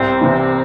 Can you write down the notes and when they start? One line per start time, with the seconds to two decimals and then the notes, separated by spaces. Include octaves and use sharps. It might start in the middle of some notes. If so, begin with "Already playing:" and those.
Already playing: C2 C4
0.21 C3 E3